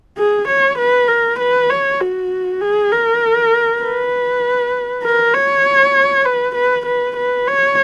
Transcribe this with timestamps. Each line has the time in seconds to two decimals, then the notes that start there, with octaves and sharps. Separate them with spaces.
0.18 G#4
0.48 C#5
0.78 B4
1.08 A#4
1.39 B4
1.70 C#5
2.00 F#4
2.61 G#4
2.91 A#4
3.82 B4
5.04 A#4
5.34 C#5
6.26 B4
6.55 B4
6.86 B4
7.17 B4
7.47 C#5